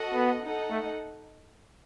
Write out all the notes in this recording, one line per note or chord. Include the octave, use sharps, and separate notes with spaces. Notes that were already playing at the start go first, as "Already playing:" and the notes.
Already playing: F#4 A4 D#5 F#5
B3
D#4 A4 D#5 F#5
A3